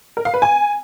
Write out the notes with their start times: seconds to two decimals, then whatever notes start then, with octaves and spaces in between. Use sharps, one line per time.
0.17 A#4
0.25 F5
0.34 B4
0.42 G#5